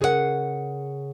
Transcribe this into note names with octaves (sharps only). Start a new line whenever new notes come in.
C#3 G#4 A#4 C5 F#5